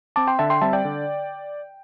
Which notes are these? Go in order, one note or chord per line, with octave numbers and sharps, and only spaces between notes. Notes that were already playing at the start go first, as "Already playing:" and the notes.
C4 A5 D6
G5 C6
D3 E5 A5
G5 C6
G3 C4 E5 A5
D5 G5
D3